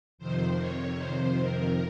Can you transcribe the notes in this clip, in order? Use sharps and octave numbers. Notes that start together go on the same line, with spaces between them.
F2 C3 D#3 C5
C#5
C5
A#4